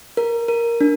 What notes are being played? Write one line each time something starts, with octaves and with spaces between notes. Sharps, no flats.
A#4
A#4
D4